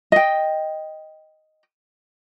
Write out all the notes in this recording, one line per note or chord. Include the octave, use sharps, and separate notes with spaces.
D#5 G5